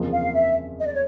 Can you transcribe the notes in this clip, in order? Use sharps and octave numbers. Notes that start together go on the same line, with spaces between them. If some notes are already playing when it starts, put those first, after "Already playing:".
Already playing: F#1 E2 C3 F3 A#3
F5
E5
D#5
D5
C#5